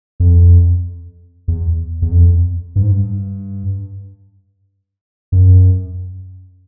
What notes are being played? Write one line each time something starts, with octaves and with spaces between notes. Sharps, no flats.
F2
E2
E2
F2
G2
G#2
G2
F#2